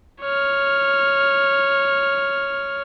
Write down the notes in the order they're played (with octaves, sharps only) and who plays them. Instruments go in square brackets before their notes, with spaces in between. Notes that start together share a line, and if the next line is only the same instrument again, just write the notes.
[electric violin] C#5 F6